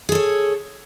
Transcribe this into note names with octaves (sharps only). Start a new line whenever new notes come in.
G#4 A4 C#5